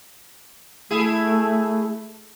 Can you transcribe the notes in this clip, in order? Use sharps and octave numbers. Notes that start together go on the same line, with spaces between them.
A3 E4 G#4